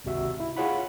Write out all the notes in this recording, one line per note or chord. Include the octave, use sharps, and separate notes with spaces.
G#1 C#2 C3 F#4 E5 E6
E4
F4 G#4 C#5 F#5 B5